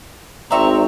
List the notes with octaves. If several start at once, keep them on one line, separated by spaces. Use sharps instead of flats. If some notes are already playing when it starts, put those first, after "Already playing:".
G#1 C4 D5 E5 A#5 C#6